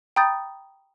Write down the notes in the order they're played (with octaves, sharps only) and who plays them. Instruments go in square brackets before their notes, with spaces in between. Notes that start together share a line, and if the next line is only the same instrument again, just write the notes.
[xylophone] G5 A#5 B5 D#6 G6 A6